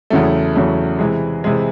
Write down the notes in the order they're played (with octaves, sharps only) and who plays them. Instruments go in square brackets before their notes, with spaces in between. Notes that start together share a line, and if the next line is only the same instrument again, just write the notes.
[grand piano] E2 C#3 F#3 A3
E2 C#3 F#3 A3
C3 E3 G#3
C3 E3 G#3